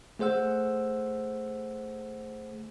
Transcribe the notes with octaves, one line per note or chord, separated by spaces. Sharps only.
A3 G#4 C5 F#5 E6